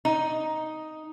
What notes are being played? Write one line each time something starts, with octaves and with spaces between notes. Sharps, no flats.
D#4